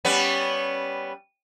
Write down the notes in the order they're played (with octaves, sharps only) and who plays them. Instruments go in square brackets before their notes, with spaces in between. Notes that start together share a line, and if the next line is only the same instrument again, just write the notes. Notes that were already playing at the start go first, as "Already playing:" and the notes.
[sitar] G3 B3 C#4